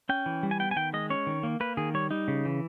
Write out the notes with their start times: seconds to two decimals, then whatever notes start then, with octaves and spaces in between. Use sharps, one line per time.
0.09 C#4 G5
0.26 E3
0.43 G3
0.51 G#5
0.60 B3 G5
0.71 G#5
0.76 D#3 G5
0.93 G#3 D#5
1.10 C#4 C#5
1.27 D#3
1.43 A#3
1.60 A#3 B4
1.77 D#3 G#4
1.94 G3 C#5
2.11 G3 D#4
2.28 C#3
2.45 E3